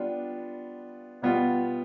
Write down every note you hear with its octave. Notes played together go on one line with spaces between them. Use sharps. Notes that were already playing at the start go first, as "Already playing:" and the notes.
Already playing: G3 B3 D4 F4
B2 G3 B3 F4